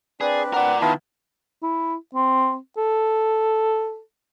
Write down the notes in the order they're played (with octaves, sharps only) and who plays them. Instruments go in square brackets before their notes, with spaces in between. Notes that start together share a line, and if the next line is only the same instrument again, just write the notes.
[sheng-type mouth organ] C4 D4 B4 [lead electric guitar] G#4 [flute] D5
[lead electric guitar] A#4 D5 [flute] F#5
[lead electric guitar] D#3 [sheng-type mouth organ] B3 E4 F4 [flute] A5
[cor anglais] E4
C4
A4